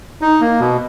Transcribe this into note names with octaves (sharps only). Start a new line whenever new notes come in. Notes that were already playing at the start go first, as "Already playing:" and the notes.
D#4
A#3
B2